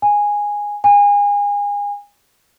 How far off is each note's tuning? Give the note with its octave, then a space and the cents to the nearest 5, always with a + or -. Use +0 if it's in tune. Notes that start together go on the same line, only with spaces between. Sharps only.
G#5 -10
G#5 -30